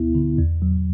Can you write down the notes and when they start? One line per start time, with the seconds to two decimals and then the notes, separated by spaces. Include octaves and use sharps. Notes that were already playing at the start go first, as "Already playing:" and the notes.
Already playing: D2 B3 E4
0.15 D3
0.38 E2
0.62 F#3